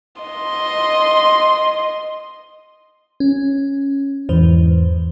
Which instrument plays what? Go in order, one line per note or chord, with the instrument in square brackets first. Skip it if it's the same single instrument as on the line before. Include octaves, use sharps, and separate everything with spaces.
[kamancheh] D#5 C6
[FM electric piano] C#4
E2 G#2 E3 C5